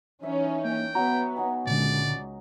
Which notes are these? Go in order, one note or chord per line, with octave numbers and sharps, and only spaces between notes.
E3 C#4 D#4 E5
A#3 G5
F#3 B3 A#5
F#3 D#4 G#5
C#2 A#2 D3 D5